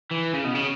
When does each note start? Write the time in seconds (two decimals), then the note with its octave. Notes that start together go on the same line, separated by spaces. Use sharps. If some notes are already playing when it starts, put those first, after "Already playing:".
0.11 E3
0.33 C#3
0.44 B2
0.55 C#3